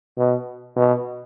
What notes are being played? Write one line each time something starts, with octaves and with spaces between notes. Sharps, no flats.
B2
B2